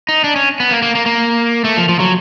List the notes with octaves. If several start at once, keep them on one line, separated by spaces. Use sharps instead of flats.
D#4
D4
C#4
B3
A#3
A#3
A#3
A#3
A3
F3
F3
F#3